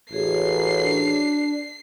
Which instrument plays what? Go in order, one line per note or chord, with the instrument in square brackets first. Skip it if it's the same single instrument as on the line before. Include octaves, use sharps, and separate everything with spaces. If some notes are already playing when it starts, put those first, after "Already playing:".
[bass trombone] A1 [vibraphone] F#4 G#4 C#5 [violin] C7
[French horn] D4